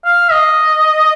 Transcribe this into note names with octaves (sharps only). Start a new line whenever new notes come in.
F5
D#5